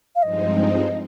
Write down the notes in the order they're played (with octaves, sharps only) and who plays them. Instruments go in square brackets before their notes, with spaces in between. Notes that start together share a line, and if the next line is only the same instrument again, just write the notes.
[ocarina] F5
[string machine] G2 F3 G#3 C4 D#4 [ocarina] D#5